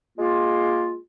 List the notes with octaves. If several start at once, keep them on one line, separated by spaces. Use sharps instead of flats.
G#3 A#3 F4